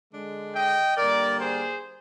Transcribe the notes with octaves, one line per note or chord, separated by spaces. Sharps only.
D3 G#3 D4
D#5 G5
D3 G3 A#3 A#4 D5
G#4 C5